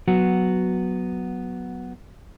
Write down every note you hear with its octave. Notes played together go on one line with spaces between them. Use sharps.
F#3 B3 F#4